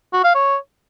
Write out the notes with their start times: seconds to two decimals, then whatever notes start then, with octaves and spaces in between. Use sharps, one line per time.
0.13 F#4
0.24 F5
0.35 C#5